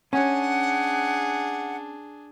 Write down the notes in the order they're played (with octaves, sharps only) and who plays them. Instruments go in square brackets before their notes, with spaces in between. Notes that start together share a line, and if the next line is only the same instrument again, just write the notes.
[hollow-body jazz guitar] C#4 [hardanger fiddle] D4 G#4 [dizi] F#5